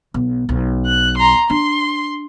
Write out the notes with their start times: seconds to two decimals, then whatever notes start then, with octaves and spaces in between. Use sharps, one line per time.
0.14 B1
0.49 B1
0.86 F#6
1.18 A#5 C6
1.50 D4 C6